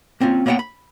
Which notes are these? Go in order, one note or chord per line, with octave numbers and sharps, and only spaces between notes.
A#3 C4 C#4 F4
A#3 B3 C#5 D#5 F#5 G5
B5